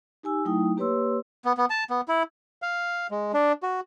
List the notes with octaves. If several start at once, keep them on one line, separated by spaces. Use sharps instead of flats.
D#4 G4 G#5 E6
F#3 A3 D#4 E4 G5 D#6
A#3 G4 B4 C#5 C6 E6
B3
B3
A5
B3
E4
F5
G#3
D4
F#4